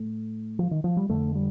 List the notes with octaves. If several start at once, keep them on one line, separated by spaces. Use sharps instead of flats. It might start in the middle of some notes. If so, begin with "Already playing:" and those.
Already playing: A2 A3
F3
D#3
F3
G3
F2 D3 A3
G3